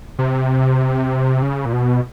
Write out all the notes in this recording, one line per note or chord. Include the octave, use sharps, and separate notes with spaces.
C3
C#3
A#2
B2